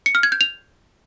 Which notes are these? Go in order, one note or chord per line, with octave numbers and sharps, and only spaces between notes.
C#7
F6
G#6
G6
F7